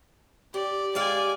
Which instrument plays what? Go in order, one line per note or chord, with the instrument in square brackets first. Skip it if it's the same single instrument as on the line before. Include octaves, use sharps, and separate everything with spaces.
[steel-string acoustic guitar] G4 [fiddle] D5
[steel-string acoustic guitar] G#3 G4 F5 [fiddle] D5 G#5